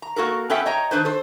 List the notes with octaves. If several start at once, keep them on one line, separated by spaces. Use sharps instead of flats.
A#5
A#3 F#4 A4 A#4
B3 C#4 A4 E5 G5
C#5 D#5 G5 A#5
D#3 F3 D4 B4 C5
A4 C5